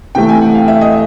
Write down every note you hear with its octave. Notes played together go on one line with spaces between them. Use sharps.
C3 E3 A3 G5
G#5
F#5
F5
E5
D#5